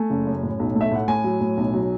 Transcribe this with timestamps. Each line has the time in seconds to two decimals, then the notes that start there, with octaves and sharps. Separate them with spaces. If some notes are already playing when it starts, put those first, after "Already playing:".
Already playing: A3 G#5
0.10 F#1
0.26 F#2
0.43 A2
0.59 B1
0.75 A3
0.81 E5
0.91 A2 F#5
1.08 A2 G#5
1.24 F#3
1.40 A2
1.57 B1
1.74 F#3